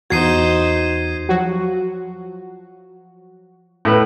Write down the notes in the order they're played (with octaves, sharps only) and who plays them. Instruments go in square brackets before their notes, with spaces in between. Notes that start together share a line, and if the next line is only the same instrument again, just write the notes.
[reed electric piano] E2 F#4 [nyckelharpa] D#4 C5 [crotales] G#6 C7 D#7
[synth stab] F3 F#3 F#4
[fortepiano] A2 B4